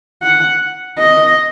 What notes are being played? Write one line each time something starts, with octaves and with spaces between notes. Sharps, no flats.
F#5
D#5